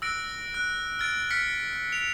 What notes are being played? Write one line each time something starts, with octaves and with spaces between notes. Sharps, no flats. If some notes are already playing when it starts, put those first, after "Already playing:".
E6 F#6 A#6 D7
F#6
F6 A6 D7
F6 B6 C#7
C#7 F7